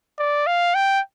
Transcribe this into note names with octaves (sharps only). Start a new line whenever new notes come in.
D5
F5
G5